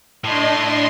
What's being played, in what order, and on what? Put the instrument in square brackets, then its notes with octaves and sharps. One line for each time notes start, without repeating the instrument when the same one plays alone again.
[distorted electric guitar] A2 [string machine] D4 D#5 C6